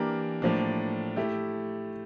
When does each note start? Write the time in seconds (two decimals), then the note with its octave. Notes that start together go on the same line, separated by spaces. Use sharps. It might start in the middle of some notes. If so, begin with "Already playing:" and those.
Already playing: E3 A#3 D4 G4 A#4
0.42 A2 F3 A#3 D4
1.16 A3 E4 G4